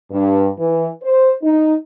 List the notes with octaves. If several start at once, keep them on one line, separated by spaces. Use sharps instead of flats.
G2
E3
C5
D#4